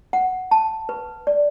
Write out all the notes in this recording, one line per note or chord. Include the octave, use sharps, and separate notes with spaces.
F#5
A5
B4
D5